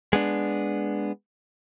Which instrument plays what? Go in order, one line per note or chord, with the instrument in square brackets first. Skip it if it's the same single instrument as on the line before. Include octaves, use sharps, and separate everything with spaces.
[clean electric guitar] G#3 B3 D4